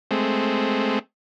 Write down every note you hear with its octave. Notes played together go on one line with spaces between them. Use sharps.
G#3 A3 C4